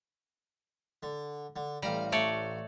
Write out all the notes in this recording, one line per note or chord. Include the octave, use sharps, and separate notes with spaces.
D3
D3
A1 G3 F5 A#5
A3 C#5 D5